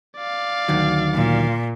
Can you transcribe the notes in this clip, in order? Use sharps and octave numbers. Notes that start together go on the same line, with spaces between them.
D5 F5
D2 D#3 F#3
A#2